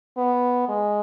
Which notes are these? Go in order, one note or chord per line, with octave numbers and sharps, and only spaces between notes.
B3
G#3